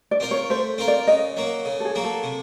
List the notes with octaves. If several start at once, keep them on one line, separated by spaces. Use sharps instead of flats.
D5
C4 F4 A#4
C#5
A3 C5
C4 F4 A#4
D5
C#3 D#5
F#3 A#3
C#3
A4
G#4
F#3 A#3
A4
C3